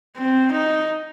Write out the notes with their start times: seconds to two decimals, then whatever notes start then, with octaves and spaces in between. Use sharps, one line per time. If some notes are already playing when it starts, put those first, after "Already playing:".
0.17 C4
0.52 D#4